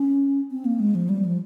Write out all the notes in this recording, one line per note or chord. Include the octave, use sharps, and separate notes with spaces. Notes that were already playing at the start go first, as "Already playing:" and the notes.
Already playing: C#4
C4
A#3
G#3
F3
G3
F3